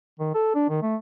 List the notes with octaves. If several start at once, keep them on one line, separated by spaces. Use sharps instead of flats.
D#3
A4
D4
D#3
A3